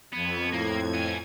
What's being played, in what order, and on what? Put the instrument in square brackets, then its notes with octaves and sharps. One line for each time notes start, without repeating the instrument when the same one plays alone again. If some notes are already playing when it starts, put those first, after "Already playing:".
[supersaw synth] F2 G#6 [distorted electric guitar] B3
[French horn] A2 [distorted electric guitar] A#3
[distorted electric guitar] B3 G#5